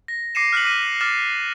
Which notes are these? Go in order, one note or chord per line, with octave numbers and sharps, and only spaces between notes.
A#6
D6 A#6 C7 C#7 D#7 E7
F6 F#6 B6 C#7 F#7
D6 A#6 B6 D#7
D6 F6 A6 E7